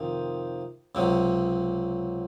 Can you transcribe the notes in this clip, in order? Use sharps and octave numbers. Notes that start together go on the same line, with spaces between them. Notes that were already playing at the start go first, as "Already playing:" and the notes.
Already playing: F2 C3 D#3
C#2 C3 F#3